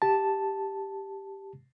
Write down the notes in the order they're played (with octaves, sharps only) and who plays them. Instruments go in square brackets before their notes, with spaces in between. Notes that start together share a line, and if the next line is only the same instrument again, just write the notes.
[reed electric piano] G4 A5